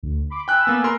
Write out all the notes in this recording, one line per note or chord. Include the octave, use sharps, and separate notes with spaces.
D2
B5 C6 D6
G5 G#5 B5 E6 F#6
A#3 B3
A#4 C6